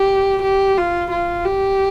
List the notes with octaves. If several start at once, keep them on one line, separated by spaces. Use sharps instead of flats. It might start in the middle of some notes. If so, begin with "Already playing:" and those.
Already playing: G4
G4
F4
F4
G4